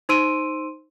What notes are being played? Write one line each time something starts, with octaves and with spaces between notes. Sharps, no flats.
D#4 C5 C6 E6 D7 D#7